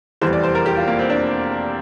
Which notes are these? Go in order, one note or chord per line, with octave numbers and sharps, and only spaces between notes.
F1 E2 E3 G3 C5
D5
C5
A#4
G4
F4
A#3
C4
D4